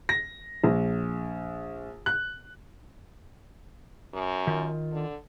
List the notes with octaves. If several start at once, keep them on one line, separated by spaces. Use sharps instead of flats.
A#6
A#1
F#6
F#2
D#3 F4
D3